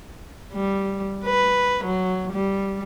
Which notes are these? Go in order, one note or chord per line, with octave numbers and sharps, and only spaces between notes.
G3
B4
F#3
G3